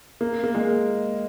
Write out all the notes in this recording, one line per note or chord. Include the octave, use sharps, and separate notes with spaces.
A#3
A#3
G#3